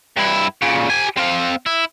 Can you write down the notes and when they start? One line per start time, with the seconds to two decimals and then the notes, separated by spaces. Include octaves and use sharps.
0.16 G2 E4
0.62 A#2 C#3
0.90 G4 G#5
1.18 C4 F5
1.66 E4